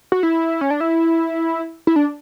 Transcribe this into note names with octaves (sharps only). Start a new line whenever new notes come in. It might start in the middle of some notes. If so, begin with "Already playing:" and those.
F#4
E4
C#4
D4
E4
E4
D4